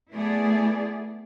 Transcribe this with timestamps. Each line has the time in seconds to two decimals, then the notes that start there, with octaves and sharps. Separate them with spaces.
0.11 A3 B3 E4 G#4 D5